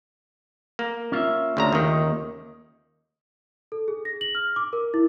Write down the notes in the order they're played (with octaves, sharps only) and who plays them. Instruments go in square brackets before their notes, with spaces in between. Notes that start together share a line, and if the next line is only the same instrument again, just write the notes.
[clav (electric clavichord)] A#3
[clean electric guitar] C#4 F4 E5
[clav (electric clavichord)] D2 C#3 A#5
D#2 D#3
[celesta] A4
G#4
A#6
F#7
F6
D6
A#4
E4